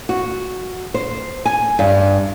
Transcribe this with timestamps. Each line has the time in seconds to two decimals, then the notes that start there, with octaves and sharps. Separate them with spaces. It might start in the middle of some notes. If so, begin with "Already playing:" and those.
0.09 F#4
0.94 C5
1.45 G#5
1.79 G2